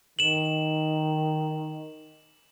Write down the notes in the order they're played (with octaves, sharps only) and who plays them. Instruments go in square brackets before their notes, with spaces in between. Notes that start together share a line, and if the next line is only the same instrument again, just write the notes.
[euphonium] D#3 [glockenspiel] E7 F#7